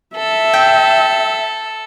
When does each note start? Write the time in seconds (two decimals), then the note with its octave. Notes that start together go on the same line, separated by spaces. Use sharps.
0.16 A4 E5
0.54 G5